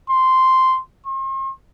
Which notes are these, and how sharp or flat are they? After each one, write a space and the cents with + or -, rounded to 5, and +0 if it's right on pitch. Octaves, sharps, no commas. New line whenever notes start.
C6 -5
C6 +45